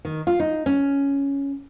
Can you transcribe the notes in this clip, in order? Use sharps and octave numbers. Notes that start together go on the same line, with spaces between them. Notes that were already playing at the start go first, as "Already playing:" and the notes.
D#3
F4
D#4
C#4